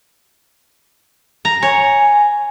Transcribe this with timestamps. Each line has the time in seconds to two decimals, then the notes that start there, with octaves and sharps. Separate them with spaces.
1.45 A#5
1.62 C#5 G#5